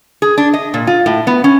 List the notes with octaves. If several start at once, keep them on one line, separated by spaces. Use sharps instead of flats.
G#4
D4
D#5
A#2
F4
A2
B3
C#4